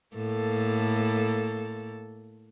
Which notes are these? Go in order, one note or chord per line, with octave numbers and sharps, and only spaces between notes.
A2 A#3 A4